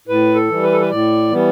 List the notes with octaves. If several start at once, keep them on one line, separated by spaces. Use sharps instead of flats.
A2 B4
A4
E3 G3
B4
A4
B4
A2 D5
E3 G3 B3